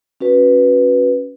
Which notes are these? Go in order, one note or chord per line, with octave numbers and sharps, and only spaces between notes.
C#4 F#4 B4